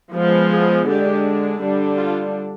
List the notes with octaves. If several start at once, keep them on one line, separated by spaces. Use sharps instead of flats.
F3 G#3 B3
G#4
D3 G#3 D4 G4
D3 G3 D4
F4